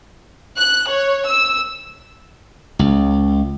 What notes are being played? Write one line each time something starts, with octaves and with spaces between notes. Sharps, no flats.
F#6
C#5
E6
C#2